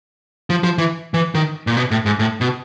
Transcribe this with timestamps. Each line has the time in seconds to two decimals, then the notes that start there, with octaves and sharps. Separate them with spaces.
0.50 F3
0.64 F3
0.78 E3
1.14 E3
1.35 D#3
1.67 A#2
1.77 B2
1.91 A2
2.06 G#2
2.19 A2
2.41 B2